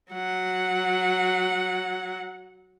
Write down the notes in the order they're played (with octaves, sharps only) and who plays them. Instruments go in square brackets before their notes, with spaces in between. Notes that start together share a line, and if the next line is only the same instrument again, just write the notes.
[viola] F#3 F#5